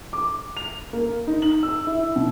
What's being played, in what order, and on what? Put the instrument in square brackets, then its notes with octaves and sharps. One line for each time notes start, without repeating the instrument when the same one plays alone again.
[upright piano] D6
F7
A#3
D#4
F#7
E6
E4
B2